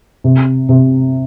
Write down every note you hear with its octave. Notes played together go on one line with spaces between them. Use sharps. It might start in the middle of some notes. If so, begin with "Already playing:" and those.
C3
C3